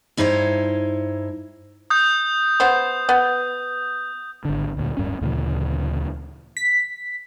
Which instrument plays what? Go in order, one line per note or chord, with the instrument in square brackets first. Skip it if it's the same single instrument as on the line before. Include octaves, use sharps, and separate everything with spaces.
[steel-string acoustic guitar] G2 D#4 E4 C5 C#5
[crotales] D#6 G6
[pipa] B3 C5
B3
[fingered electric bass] G#1 D3
D2 A#2
D1 G2 C#4
D2 A#2 C#3 E3
[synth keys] B6